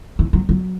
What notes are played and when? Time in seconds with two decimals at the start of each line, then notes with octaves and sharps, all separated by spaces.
0.19 E3
0.33 F#3
0.49 F#3